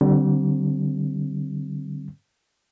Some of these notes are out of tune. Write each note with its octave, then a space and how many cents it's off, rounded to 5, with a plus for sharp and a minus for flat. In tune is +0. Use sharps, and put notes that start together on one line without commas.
D3 +0 G3 -40 C4 +5